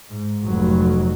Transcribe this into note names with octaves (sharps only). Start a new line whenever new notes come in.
G#2
F1 F#3